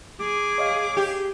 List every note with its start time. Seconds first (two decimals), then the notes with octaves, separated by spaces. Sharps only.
0.20 G#4 D6
0.58 C#5 D#5 F5
0.97 G4